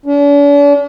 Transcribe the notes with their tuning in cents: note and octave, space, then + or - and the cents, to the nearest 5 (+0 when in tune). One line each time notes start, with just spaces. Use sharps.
D4 -45